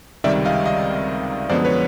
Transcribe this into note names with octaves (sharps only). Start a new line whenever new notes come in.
C#2 C3 D#3 G3 D5 E5
D#5 F5
D#5 F5
F#2 D3 F3 G#3 B3 C5 D5
B4 C#5